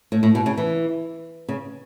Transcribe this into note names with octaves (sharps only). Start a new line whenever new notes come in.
A2
A2
B2
C#3
E3
C#3